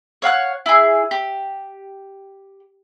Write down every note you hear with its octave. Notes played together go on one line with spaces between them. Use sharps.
C#5 F5 F#5 F#6
E4 G#4
G4